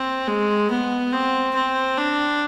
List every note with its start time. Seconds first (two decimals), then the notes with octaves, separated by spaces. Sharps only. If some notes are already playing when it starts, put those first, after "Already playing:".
Already playing: C4
0.27 G#3
0.70 B3
1.13 C4
1.55 C4
1.98 D4